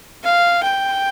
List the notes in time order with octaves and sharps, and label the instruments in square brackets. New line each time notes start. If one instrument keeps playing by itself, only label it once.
[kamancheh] F5
G5